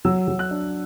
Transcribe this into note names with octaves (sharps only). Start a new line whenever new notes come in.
F#3 E6
F#3
F#6
D4